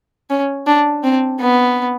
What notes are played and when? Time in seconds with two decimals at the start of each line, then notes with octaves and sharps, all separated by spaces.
0.30 C#4
0.67 D4
1.03 C4
1.40 B3